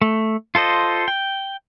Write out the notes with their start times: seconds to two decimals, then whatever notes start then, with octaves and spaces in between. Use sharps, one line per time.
0.02 A3
0.55 F4 A4 C5 D#5
1.08 G5